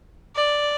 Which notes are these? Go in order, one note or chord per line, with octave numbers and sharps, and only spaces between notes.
D5